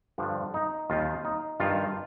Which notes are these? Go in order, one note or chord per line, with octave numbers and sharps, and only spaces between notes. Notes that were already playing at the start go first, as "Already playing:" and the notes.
G2 D3 F3 D4
D#4
D#2 D#3 F4
D#4
G2 D#3 F4